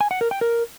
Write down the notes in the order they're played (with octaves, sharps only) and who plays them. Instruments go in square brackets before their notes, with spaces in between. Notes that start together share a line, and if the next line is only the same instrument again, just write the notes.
[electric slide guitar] G#5
F#5
A#4
G5
A#4